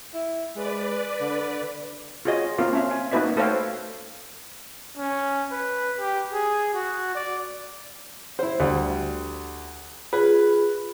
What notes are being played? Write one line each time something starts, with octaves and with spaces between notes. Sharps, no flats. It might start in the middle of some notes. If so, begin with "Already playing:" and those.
E4
G#3 B4 D5
D3
F4 F#4 G#4 C#5 D#5
A#3 C4 F4 A#4 F5
C#4 E5 F5
G#5
A#3 D#4 F#4 B4 D5 E5
A3 A4 C5 C#5 F5 G5
C#4
B4
G4
G#4
F#4
D5
E4 C5
D2 G3
F4 G#4 B4